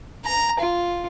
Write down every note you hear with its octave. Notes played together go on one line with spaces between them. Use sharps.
A#5
F4